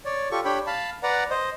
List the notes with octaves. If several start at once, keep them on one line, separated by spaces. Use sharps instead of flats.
C#5 D5
F4 G4 A4 C#6
D4 G4 C#5 G5 B5
F5 A5 B5
B4 D5 F#5 A#5
C5 D#5